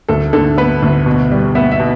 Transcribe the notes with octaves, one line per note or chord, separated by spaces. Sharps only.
D2 A4
D3 A4
B3 B4
D2
B2
G3
B3 E5
E5
B2